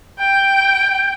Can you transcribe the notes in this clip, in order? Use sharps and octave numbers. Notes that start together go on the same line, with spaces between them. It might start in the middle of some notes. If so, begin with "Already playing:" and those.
G5